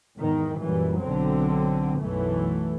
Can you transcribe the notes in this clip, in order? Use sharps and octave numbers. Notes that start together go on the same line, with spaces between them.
E2 G#2 D#3
F#2 A#2 E3 G3
B1 D3 F#3 C4
B1 F#2 E3 A3